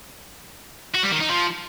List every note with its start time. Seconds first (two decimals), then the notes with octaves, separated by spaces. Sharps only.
0.95 F#4
1.03 G3
1.12 D#3
1.21 D#4
1.29 F3